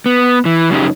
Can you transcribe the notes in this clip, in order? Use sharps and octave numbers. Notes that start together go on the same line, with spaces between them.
B3
E3
F#2 C#3 C#4 D#4 G4